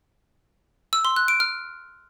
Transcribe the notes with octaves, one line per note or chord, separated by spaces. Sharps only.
E6
C6
F#6
D7
F6